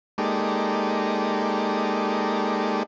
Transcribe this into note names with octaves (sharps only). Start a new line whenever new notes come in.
G#3 A#3 D#4 G4 A4 D5